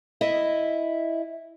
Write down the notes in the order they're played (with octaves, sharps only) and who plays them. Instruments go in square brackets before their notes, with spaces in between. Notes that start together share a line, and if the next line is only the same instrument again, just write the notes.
[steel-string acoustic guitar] E4 D#5 E5